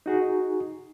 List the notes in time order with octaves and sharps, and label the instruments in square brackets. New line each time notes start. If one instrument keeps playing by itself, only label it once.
[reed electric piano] D#4 F#4 G#4